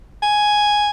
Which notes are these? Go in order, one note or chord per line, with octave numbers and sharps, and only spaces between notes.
G#5